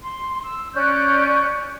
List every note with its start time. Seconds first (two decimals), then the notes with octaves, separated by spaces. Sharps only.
0.01 C6
0.44 E6
0.74 C#4 D5 F#6 G6